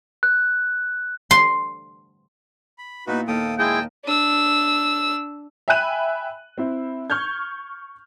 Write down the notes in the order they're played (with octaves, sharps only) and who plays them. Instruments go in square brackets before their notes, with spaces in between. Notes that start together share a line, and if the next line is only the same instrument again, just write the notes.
[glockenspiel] F#6
[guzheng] C6
[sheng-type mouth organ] B5
[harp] A#2 B3 E4 [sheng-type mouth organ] D#4 F#4 B4
[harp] D#2 F6 [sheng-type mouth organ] A4 G5 D#6
[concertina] G#3 E4 G#4 [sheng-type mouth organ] D#5 A5 [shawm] G5
[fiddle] D4 E6
[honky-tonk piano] E5 G5 G#5 B5 F#6 D#7
C4 E4
C#6 F6 G6 G#6